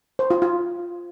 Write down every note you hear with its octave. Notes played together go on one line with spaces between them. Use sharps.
C5
F4
F4